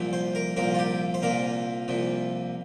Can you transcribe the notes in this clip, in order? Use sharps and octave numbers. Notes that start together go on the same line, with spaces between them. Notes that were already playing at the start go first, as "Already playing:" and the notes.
Already playing: C2 A#2 F3
C5
A#4
C2 A#2 F3 A#4
F4
G4
C5
C2 A#2 F3 A#4
C2 A#2 F3